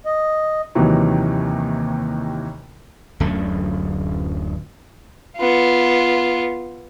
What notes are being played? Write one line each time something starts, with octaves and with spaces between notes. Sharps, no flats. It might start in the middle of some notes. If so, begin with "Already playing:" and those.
D#5
D#2 C3 D#3 E3 F#3
D1 F#2 D3 A3
B3 F4